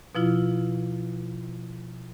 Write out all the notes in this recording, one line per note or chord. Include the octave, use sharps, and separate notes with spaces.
B2 F3 E4 F4